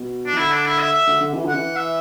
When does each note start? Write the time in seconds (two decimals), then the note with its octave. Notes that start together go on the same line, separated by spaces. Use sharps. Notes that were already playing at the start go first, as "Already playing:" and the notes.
Already playing: B2
0.27 D4
0.33 E3
0.38 D3 E4
0.52 D4
0.66 E4
0.79 E5
0.93 E5
1.07 D3
1.21 D3
1.34 E3
1.45 D3 F#5
1.55 E3
1.76 E5